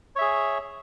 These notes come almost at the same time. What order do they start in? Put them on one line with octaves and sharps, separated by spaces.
C#5 E5 G#4